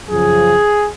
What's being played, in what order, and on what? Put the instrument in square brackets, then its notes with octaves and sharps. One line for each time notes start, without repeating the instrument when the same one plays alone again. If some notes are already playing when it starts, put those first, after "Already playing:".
[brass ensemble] F#2 C#3 F3 G#4